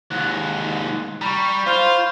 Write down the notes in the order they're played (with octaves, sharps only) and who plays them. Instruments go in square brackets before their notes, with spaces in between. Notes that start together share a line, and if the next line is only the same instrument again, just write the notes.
[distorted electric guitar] D#2 G#2 [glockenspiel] F#6
[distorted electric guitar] G3 [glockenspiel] A#5 B5 C#6
[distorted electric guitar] F4 [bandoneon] C5 F5